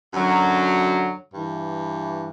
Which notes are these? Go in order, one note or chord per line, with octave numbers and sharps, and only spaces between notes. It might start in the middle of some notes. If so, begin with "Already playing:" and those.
F#2 D3 F#3
G2 E3